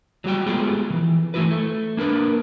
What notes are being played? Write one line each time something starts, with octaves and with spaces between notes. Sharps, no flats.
F#3 G3 F#4 G5
G#3 A3 B3 F4 G4 G#4
D#3 E3
E3 A3 E4 F#4 B4
A3
A#3 D4 A#4 B4